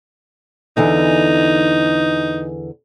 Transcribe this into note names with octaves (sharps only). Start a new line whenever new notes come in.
E2 D3 E3 D#4